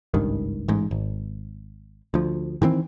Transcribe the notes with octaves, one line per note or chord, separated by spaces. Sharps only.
G#1 C#2 G2 D#3
A1 G#2
G#1
D2 F3
D#3 E3 G3 C4